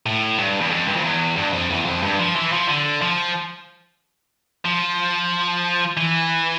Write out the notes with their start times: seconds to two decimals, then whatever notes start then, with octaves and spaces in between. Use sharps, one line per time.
0.06 A2
0.39 G2
0.61 E2
0.71 F2
0.88 G2
0.96 F2
1.04 E2
1.36 G2
1.53 F2
1.70 E2
1.86 F2
2.03 G2
2.19 F3
2.36 E3
2.52 F3
2.68 D3
3.02 F3
4.65 F3
5.97 E3